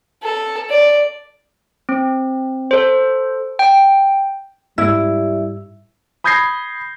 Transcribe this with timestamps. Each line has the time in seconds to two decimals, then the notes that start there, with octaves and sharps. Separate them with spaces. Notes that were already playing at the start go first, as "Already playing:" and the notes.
0.23 A4
0.70 D5
1.89 C4
2.71 A4 C5
3.59 G5
4.78 G#2 G3 C#4 E4
6.24 B5 D#6 G6 G#6 A#6 C7